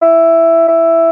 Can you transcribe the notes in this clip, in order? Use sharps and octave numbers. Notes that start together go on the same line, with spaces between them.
E4
E4